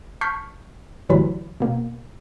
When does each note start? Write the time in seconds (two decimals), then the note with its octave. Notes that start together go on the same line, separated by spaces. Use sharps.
0.21 A5 C#6 F6 G6 B6 C7
1.09 G1 D2 E3 F#3 G3 B5
1.60 B2 A#3